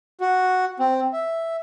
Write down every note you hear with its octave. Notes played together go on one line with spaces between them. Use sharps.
F#4
C4
E5